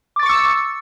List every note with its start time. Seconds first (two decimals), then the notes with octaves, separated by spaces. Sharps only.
0.16 D6
0.19 A6
0.23 C#6
0.26 C#7
0.29 E6